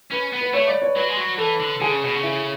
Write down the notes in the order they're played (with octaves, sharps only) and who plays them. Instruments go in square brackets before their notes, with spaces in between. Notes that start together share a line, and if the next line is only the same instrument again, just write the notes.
[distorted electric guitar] C#4 [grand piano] B4
[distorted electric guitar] B3
[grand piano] B4
[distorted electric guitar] A3 [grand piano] C#5
[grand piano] D5
C#5
[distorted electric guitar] F#3 [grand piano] B4
[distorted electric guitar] G#3
F#3
[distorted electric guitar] E3 [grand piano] A4
[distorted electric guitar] D3
[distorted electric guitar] D3 [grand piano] G#4
[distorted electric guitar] C#3
B2
C#3
[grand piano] E4